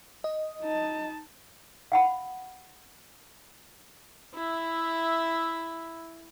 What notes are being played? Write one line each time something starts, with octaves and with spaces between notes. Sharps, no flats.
D#5
D#4 A5
F5 F#5 B5
E4 E5